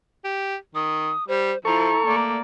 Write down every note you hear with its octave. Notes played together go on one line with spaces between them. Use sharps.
G4
D#3 D#6
G3 C5
F3 E4 A4 A#5 C#6
A3 A#3 D5